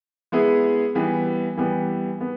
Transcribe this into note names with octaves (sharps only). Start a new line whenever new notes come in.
G#3 B3 E4 G#4
E3 G3 B3
E3 G3 B3
B3